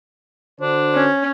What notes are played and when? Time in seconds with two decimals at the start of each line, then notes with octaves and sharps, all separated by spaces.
0.61 D3 D4 F#4 C5
0.94 C#4